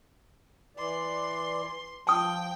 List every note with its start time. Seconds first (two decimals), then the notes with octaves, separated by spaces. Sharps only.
0.77 E3 D5 C6
2.07 F3 G5 A5 D#6